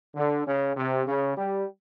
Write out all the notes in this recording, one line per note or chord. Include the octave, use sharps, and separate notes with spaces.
D3
C#3
C3
C#3
G3